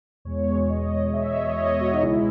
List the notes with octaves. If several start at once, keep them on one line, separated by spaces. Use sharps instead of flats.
E2 B2 G#3 C#5
D#5
E5
C#5
D#5
C#5
D#5
C#5
F#4
D#4
C#2 B2 G#3 E4